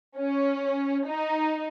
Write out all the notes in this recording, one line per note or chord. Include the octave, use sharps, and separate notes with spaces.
C#4
D#4